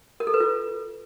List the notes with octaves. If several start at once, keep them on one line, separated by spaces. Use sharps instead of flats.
A#4
A4
B4
F4